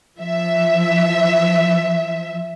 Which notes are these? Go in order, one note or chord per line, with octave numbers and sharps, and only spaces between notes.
F3 E5